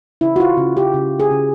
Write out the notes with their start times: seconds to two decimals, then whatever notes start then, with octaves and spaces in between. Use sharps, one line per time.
0.21 C#3 E4
0.36 F#4
0.40 F4
0.57 C#3
0.77 G4
0.94 C#3
1.20 G#4
1.31 C#3